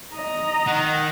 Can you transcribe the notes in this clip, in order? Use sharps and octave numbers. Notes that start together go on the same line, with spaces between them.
D#5 A#5
D#3 F#5